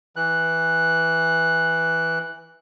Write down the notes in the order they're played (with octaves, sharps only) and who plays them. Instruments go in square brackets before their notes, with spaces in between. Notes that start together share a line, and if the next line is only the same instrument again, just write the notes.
[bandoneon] E3 F#6